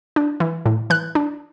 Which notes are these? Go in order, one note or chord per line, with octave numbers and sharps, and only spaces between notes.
D4
E3
A2
E3 F#6
D4